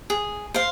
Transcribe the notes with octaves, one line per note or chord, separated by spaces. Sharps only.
G#4
C5 F5